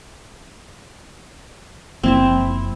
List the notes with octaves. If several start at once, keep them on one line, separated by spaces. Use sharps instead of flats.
F#1 F3 A#3 C4 E4 E5